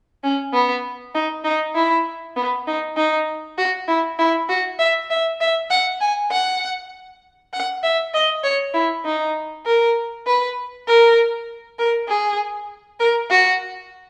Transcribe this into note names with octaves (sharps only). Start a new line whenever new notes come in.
C#4
B3
D#4
D#4
E4
B3
D#4
D#4
F#4
E4
E4
F#4
E5
E5
E5
F#5
G#5
F#5
F#5
E5
D#5
C#5
E4
D#4
A#4
B4
A#4
A#4
G#4
A#4
F#4